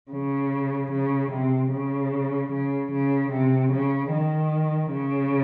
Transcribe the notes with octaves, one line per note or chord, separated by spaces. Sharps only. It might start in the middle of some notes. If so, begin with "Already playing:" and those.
C#3
C#3
C3
C#3
C#3
C#3
C3
C#3
D#3
C#3